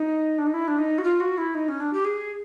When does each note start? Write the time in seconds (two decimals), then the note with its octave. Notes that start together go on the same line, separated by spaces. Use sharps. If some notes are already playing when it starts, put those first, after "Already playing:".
Already playing: D#4
0.38 D4
0.47 D#4
0.54 E4
0.68 D4
0.78 D#4
0.98 F#4
1.04 F4
1.20 F#4
1.38 E4
1.55 D#4
1.68 C#4
1.80 D4
1.93 G4
2.05 G#4